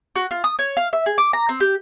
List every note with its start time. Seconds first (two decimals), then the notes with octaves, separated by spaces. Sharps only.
0.16 F#4
0.31 F4
0.44 D#6
0.59 C#5
0.77 F5
0.93 E5
1.06 G#4
1.18 D6
1.33 A#5
1.49 C4
1.60 G4